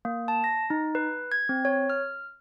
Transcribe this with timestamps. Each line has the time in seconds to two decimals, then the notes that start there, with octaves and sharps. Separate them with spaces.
0.05 A#3
0.28 A5
0.44 A#6
0.70 D#4
0.95 B4
1.32 G#6
1.49 C4
1.65 C#5
1.90 F6